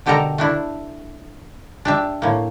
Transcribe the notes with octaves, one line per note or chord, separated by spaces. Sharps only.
B2 D3 G4 A4 A#4 A#5
A3 D4 E4
D4 G4 E5
A2 A#3